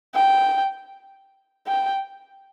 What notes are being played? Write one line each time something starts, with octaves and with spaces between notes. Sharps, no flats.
G5
G5